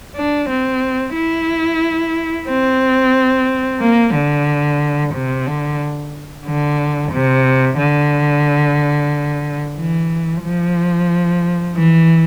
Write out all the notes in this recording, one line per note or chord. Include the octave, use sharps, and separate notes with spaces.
D4
C4
E4
C4
A#3
D3
C3
D3
D3
C3
D3
E3
F3
E3